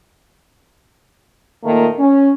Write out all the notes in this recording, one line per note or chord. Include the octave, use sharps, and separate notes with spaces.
A#2 D#3 A3 A#3
C#4